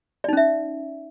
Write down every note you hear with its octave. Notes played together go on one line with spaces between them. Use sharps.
C#4 D#4 D5 E5